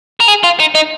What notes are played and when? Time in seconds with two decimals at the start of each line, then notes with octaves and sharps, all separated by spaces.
0.21 A#4
0.28 G#4
0.44 F4
0.60 D#4
0.75 D#4